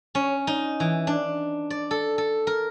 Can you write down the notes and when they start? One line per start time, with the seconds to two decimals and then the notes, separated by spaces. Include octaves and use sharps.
0.15 C#4
0.47 D#4
0.80 E3
1.07 D4
1.70 D5
1.91 A4
2.18 A4
2.47 A#4